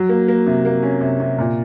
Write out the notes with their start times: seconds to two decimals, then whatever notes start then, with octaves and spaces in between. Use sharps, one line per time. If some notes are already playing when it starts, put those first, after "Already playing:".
Already playing: F#3
0.09 A#3
0.28 A#3
0.47 C3
0.65 A#3
0.83 C#4
1.01 C3
1.20 C3
1.38 A#2